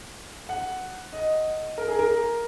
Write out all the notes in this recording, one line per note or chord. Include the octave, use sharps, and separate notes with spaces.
F#5
D#5
A#4
G#4
A#4